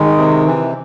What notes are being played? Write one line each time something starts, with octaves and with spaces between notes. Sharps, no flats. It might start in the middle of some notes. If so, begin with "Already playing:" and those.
Already playing: D#3 G#3
C3
E3